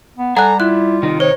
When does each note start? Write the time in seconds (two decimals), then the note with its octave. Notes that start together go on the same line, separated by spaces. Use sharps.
0.17 B3
0.37 G3 A4 F#5 G#5 A#5 F#6
0.60 E4 F4 F#6
1.03 C3 D#3 D#4
1.20 C5 C#5